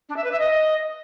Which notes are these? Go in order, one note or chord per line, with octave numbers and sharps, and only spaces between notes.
D4
E5
B4
E5
D#5